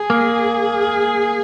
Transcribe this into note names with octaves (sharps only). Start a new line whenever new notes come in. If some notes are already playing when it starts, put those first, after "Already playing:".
Already playing: G#4
A#3